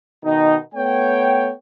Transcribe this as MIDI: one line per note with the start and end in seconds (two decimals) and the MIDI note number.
0.24 0.55 47
0.24 0.55 51
0.24 0.55 63
0.74 1.50 57
0.74 1.50 59
0.74 1.50 73
0.74 1.50 79